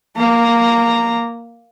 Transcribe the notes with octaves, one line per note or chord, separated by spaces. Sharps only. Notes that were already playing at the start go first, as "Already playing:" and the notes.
A#3 A#5